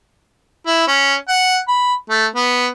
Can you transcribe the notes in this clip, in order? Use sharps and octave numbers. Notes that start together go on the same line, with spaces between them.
E4
C#4
F#5
B5
A3
B3